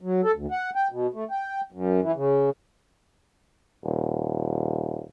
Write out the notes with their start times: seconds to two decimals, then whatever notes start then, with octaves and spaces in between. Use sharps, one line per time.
0.01 F#3
0.24 A4
0.35 D2
0.51 F#5
0.75 G5
0.92 B2
1.14 A3
1.31 G5
1.72 F#2
2.02 E3
2.16 C#3
3.84 D#1